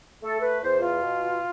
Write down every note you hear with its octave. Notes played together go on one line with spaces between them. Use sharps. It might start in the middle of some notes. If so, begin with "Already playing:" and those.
A3 A4
B4
E2 C5
F4
B2